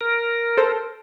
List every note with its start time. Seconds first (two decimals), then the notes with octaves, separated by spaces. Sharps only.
0.01 A#4
0.57 A4 C5